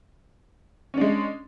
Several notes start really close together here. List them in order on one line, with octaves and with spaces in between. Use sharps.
C#4 D4 G#3